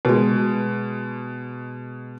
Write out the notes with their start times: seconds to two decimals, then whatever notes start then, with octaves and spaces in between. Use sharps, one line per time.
0.05 B2 G#3